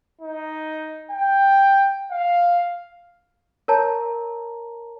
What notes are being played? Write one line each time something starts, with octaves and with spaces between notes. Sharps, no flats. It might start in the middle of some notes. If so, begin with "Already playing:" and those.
D#4
G5
F5
A#4 C#5 A5 A#5